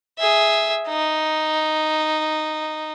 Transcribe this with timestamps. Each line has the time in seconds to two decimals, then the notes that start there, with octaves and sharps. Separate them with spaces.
0.19 G#4 E5
0.88 D#4